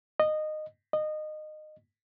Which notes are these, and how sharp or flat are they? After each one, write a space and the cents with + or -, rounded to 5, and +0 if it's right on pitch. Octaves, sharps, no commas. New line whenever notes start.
D#5 -15
D#5 -20